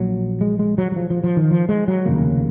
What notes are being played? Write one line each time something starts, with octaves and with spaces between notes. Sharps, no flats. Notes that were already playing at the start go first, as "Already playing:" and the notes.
Already playing: A#1 A#2 F#3
G#3
G#3
F#3
F#3
F3
F3
F3
D#3
F3
G#3
F#3
F1 D#2 C#3 A#3